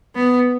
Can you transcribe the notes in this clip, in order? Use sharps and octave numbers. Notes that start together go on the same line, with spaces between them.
B3